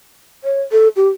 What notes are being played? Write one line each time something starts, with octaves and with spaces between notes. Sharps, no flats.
C#5
A4
G4